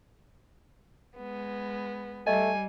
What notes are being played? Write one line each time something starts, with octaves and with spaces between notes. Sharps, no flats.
G#3 B3
G3 A3 D#5 G#5